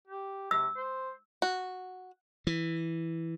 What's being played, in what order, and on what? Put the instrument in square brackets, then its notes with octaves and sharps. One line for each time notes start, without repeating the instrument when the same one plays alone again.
[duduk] G4
[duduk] C3 [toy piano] E6
[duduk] C5
[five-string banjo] F#4
[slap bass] E3